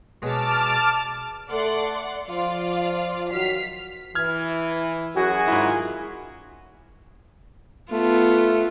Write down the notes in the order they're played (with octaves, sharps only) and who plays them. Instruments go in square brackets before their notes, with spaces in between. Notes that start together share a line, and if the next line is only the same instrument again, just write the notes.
[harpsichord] B2 F#3 G#3 [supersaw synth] A5 D6 F6
[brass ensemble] A3 A4 [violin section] D5 F#5 C6
[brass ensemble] F3 [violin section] F4 D5 F5
[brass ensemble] D#3 F#3 F#4 [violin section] F6 B6 C7
[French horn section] E3 [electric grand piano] F6 G#6
[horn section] F#2 F#4 [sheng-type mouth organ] G#4 G#5
[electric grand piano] G#2 E4 [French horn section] D#3 G#3 F4
[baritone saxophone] A3 [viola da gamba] B3 F4